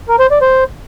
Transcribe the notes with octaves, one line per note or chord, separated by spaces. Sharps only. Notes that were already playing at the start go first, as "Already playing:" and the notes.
A#4
C5
D5
C5